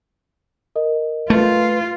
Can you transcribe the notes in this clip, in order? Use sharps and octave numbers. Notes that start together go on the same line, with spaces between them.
A#4 D#5
A3 F4 B4